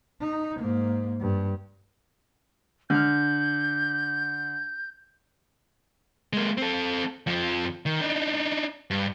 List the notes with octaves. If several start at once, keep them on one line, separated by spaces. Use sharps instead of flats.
D#4
G#2 A#3
G2
D3 F6 G6
G#3 A#3
C4 A4
F2 F3
D#3
D4 D#4
G2